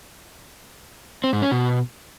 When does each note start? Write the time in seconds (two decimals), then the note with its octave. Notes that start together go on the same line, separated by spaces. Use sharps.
1.24 C4
1.33 G#2
1.42 C#4
1.51 B2